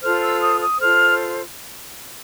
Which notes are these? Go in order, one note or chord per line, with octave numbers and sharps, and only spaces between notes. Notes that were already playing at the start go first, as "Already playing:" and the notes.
F4 A4 C5 F6
E6
D#6
D#6
F4 A4 C5 F6